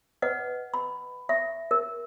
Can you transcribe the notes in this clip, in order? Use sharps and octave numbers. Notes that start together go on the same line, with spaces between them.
B4 D#5 F#5
B5
E5
A#4